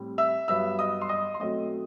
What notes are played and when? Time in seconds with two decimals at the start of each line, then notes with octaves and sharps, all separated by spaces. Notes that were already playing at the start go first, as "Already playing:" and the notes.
Already playing: A2 G3 C4
0.18 E5 E6
0.48 G2 F#3 B3 E5 E6
0.79 D#5 D#6
1.01 C6
1.09 D#5 D#6
1.34 C6
1.40 B2 F#3 A3 C4 D#5 D#6